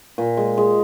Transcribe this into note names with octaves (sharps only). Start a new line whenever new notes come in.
A#2
G#3
G#3